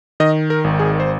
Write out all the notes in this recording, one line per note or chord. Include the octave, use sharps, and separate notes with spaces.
D#3 D#5
A#4
G#1
G#4
C5